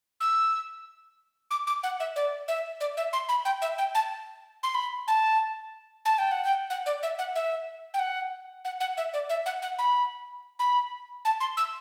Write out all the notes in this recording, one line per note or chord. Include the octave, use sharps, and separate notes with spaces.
E6
D6
D6
F#5
E5
D5
E5
D5
E5
C6
B5
G5
E5
G5
A5
C6
B5
A5
A5
G5
F#5
G5
F#5
D5
E5
F#5
E5
G5
F#5
F#5
F#5
E5
D5
E5
F#5
F#5
B5
B5
A5
C6
E6